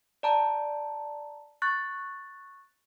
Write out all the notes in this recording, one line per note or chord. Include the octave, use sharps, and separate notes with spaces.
D5 A5 A#5
C#6 F#6 A6